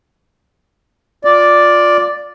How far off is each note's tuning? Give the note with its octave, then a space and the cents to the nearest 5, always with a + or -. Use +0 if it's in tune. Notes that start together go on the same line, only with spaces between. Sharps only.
F4 +20 D5 +0